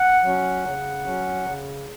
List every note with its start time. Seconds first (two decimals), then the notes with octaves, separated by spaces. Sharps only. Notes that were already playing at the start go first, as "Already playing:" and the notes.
Already playing: F#5
0.24 F#3 C#4
0.65 C#3
1.05 F#3 C#4
1.46 C#3